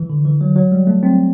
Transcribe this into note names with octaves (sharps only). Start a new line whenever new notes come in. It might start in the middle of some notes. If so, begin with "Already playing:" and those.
Already playing: E3
D3
E3
F#3
F#3
G3
A3
C4